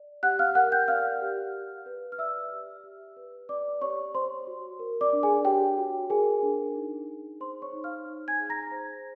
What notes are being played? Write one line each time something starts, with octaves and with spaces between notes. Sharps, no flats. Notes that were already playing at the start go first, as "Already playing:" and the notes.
Already playing: D5
G4 F#5 F#6
F5 F6
A#4 F#5 F#6
G5 G6
D5 F5 F6
G4
G4
B4
F6
D5 E5 E6
G4
G4
B4
D5 D6
G4 C#5 C#6
C5 C#5 C6
F#4
A#4
D5 D6
D4
G#4 G#5
G4 C#5 G5
F#4
G#4 A#4 G#5
D4
D#4
G#4
C5 C6
C#5 C#6
D#4
F5 F6
D#4
G#5 G#6
G#4
A#5 A#6
C5